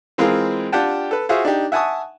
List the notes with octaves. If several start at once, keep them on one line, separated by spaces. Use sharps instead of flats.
E3 G#3 C4 F4 G#4 A#4
D4 F4 G4 F#5 G5 A5
A4 B4
F4 F#4 G#4 C5 E5 F#5
D4 D#4 G4
E5 F#5 G#5 A5 C#6 D#6